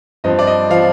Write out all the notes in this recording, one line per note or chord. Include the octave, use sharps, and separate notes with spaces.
G2 F3 C4 D#5
D5
D#5
F3 C4 F5